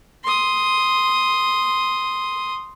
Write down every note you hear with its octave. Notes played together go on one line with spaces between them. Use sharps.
C6 D#6